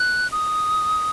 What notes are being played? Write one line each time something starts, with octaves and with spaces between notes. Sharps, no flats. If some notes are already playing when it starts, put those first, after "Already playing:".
Already playing: F#6
D#6